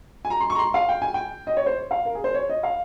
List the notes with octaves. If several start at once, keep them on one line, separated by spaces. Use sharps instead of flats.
G#5
A#5
C6
C#6
A#5
C6
F5
G5
G#5
G5
D#5
C#5
C5
F5
A#4
G#4
C5
C#5
D#5
F5